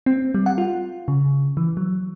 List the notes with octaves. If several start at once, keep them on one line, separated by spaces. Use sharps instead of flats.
C4
G3
F#5
F4
C#3
E3
F#3